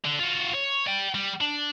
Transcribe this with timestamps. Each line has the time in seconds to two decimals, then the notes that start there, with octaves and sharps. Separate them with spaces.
0.04 D3
0.19 F4 F#4
0.54 C#5
0.87 D5 G5
1.15 G3
1.41 D4